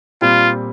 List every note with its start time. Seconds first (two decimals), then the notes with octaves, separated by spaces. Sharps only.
0.21 A#2 G3 C4 F4